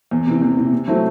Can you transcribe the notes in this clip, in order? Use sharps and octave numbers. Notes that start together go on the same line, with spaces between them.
E2
C3 E3
E2
C3 E3
C3
F#3 A3 C4 E4